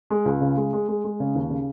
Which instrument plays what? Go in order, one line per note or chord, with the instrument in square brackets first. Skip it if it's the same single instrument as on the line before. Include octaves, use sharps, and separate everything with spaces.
[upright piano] G#3
C#2
C#3
G#3
G#3
G#3
G#3
C#3
D#2
C#3